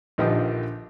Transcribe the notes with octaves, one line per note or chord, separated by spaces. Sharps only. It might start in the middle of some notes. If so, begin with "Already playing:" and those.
A#1 D3 D#3 F3 G4 D#5